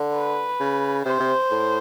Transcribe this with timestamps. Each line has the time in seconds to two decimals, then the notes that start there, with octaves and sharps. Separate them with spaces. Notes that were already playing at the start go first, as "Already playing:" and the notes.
Already playing: D3
0.14 B4
0.60 C#3
1.05 C3 C5
1.20 C3
1.51 A2